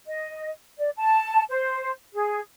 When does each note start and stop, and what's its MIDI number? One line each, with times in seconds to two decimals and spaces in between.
0.07 0.50 75
0.79 0.90 74
0.97 1.44 81
1.50 1.91 72
2.14 2.39 68